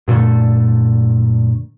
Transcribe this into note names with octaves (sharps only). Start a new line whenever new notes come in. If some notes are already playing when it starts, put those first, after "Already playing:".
F#2 A#2 D3 A3